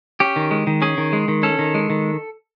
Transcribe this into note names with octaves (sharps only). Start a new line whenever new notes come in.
C#4 G4
D#3
G#3
D#3
C#4 G#4
D#3
G#3
D#3
C#4 A4
D#3
G#3
D#3